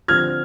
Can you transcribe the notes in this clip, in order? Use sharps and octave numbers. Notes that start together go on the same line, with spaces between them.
D3 F3 C4 F6 G#6